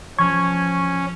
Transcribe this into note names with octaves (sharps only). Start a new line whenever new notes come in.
F3 C#4 C#6 G#6